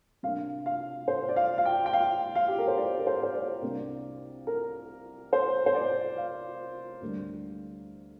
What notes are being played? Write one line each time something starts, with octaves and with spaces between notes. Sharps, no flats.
C3 A#3 D4 F5
F5
C5
D5
F5
F5
G5
G5
F5
F5
G4
A#4
C5
D5
A#4
C5
C5
D5
C2 C3 A#3 D4
A#4
C5
C5
D5
F5
D2 D3 G3 A#3 D4